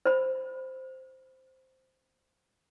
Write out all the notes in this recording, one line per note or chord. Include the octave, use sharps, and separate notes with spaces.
C5 B5